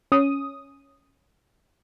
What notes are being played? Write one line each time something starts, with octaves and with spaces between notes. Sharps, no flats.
C#4 D#6